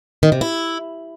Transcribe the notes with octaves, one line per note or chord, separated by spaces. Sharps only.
D#3
C3
E4